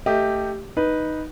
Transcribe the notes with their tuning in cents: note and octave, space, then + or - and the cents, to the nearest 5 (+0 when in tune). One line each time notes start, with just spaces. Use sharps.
A3 +15 G4 +0 D#5 +10
D#4 +0 B4 -10